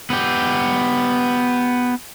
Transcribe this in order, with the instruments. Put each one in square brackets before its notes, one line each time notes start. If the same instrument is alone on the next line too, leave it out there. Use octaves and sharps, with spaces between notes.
[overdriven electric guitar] B3 G4